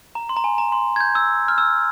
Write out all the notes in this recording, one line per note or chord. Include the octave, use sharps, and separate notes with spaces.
A#5
C6
A#5
G#5
A#5
C6
G#6
G6
E6
F6
E6